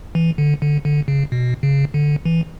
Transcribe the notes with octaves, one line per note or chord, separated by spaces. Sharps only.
E3
D3
D3
D3
C#3
B2
C#3
D3
E3